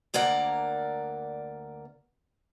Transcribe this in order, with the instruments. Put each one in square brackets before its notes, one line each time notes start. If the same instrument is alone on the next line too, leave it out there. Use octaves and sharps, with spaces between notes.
[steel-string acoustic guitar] D2 A#3 A#4 D5 F#5